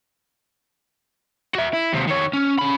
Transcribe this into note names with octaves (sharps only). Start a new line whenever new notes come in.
F#4 E5
E4
D#2 C3
D#3 C#5
C#4
C#4 B5